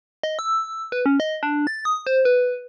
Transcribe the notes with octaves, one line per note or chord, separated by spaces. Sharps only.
D#5
E6
B4
C#4
D#5
D4
A6
D#6
C5
B4